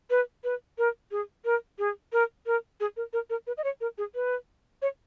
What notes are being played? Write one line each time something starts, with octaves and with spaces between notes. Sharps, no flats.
B4
B4
A#4
G#4
A#4
G#4
A#4
A#4
G#4
A#4
A#4
A#4
B4
D#5
C#5
A#4
G#4
B4
C#5